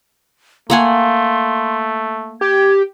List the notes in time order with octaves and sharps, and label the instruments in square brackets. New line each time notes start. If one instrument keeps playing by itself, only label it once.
[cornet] A3 [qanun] A#3 F#5 G#5 [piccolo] C6
[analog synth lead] G4 [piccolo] G#6